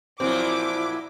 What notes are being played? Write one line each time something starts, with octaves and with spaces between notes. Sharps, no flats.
A#2 F3 F#3 C4 E4 D6